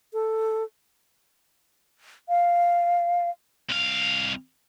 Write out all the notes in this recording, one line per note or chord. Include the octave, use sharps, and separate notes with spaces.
A4
F5
C2 F5